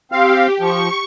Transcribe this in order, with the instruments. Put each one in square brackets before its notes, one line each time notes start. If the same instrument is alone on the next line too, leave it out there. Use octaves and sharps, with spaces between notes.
[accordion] C4 F5 [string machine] G4
[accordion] F3 [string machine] C#6